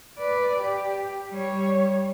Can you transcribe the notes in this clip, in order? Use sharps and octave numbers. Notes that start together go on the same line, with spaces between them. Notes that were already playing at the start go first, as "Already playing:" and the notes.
B4 D5
G4
G3 C#5